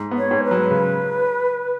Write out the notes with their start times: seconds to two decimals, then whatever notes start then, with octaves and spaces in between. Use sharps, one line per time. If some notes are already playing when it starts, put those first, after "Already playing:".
Already playing: G#2
0.11 B3
0.17 C#5
0.31 G#2
0.44 B4
0.51 F#3
0.71 C#3